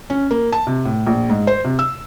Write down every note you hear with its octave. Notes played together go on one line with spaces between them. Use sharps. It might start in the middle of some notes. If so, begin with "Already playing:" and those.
C#4
A#3
A5
C3
A2
A#1
G#2
C5
C3
E6